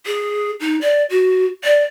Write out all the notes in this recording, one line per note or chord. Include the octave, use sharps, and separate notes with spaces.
G#4
D#4
D5
F#4
D5